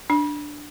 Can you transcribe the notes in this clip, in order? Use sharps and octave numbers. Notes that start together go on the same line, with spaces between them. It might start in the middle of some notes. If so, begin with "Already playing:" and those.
D4